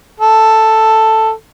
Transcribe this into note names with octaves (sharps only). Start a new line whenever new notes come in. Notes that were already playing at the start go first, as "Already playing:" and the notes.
A4